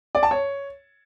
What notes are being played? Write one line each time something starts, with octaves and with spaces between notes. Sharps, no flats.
D5
A5
C#5